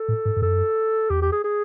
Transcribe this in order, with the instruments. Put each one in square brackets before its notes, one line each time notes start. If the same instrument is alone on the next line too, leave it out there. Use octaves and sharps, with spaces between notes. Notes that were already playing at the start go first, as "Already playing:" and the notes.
Already playing: [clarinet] A4
[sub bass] A2
G#2
G2
[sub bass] F#2 [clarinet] A4
[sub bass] E2 [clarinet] G4
[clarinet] G4
G#4
G#4